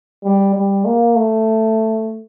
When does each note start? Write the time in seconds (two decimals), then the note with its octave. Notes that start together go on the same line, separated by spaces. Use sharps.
0.24 G3
0.54 G3
0.85 A#3
1.16 A3